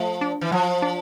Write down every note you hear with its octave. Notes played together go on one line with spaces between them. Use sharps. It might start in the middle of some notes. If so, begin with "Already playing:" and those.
Already playing: F3 A3
D4
E3
F3 F#3
D4